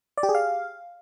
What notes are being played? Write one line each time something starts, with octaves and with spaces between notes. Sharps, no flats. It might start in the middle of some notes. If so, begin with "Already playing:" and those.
D5
G4
G#4
F5